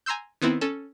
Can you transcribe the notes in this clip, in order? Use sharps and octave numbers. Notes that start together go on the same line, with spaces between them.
G#5 A#5 C6 E6 G6
D#3 B3 C4 E4
C#4 A4